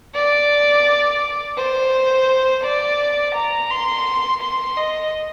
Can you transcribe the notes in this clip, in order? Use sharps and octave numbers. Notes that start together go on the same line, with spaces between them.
D5
C5
D5
A#5
C6
C6
D#5